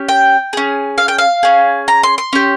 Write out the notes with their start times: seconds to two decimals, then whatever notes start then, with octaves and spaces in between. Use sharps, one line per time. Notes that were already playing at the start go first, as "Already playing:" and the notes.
Already playing: C#4 G4
0.09 G5
0.53 C#4 G#4
0.98 F5
1.08 G5
1.18 F5
1.43 C#4 G#4
1.88 A#5
2.03 C6
2.18 C6
2.33 C#4 G4